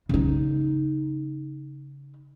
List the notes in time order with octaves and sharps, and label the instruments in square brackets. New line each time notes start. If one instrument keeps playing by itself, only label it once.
[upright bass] C#3 D#4